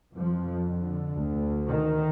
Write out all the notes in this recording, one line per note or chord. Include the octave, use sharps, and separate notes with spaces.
F2 F3
D3
D2
D#3